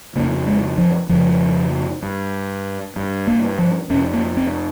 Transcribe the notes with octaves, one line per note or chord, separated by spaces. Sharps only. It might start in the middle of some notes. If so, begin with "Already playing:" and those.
F2 C#3 A#3
G#3
F3
F2 C#3 F3
G2
G2
A#3
F3
F2 C3 C#4
A#3
C4